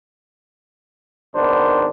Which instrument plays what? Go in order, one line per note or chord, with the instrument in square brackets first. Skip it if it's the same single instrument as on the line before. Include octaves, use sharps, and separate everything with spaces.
[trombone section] G#1 D#3 B3 D4 C5